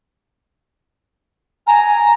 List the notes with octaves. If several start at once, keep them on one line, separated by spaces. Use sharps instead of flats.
G#5 A#5